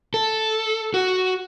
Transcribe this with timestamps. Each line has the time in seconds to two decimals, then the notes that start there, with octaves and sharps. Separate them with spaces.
0.14 A4
0.94 F#4